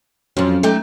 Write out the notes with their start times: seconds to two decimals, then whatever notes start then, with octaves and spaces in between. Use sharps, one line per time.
0.37 F2 F3 F#3 C#4
0.63 A3 D#4 G4